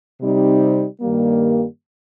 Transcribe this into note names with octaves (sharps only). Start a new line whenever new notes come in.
C3 G3 C4 D#4
G2 D#3 G3 A#3